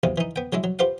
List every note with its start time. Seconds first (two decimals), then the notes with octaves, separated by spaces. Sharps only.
0.03 B1 E2 C3 F5
0.18 E3 D#4
0.36 B3 G5
0.53 F#3 G#3 D4 E4
0.64 F#3
0.79 F4 G4 B4 C5 F5 F#5